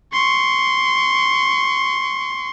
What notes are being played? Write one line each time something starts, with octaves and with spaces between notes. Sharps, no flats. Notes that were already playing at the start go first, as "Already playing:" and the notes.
C6 C#6